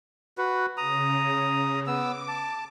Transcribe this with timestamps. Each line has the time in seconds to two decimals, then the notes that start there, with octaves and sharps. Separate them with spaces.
0.38 F#4 B4
0.77 C#3 A#5 D#6
1.87 B3 D6 E6
2.28 A5